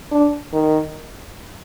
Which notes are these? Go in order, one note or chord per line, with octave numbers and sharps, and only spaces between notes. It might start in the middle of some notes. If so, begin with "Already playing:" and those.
D4
D#3